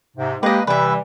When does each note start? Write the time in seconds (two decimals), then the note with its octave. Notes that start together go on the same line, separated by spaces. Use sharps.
0.17 G#2 C3
0.43 G#3 A#3 G4 B4 D#5
0.67 C3 E3 G3 B4 E5